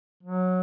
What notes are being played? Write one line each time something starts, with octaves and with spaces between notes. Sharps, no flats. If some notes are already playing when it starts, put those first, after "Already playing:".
F#3